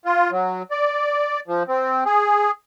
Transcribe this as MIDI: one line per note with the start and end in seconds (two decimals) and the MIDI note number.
0.05 0.30 65
0.31 0.62 54
0.71 1.40 74
1.48 1.63 53
1.68 2.04 60
2.06 2.51 68